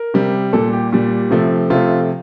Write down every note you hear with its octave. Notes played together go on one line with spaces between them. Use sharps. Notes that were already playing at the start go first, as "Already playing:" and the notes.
Already playing: A#4
C3 G3
A#2 G3 A4
G4
A#2 G3
C3 F3 A3
C3 F3 A3 F4